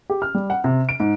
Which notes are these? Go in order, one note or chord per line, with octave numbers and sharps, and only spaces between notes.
G4
F6
G3
F#5
C3
D7
G#2